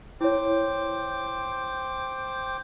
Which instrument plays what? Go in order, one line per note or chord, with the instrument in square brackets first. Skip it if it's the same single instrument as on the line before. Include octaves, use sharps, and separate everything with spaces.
[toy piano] E4 C#5 [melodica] C5 G5 D6